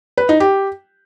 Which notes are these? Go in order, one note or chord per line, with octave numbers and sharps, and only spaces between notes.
B4
D#4
G4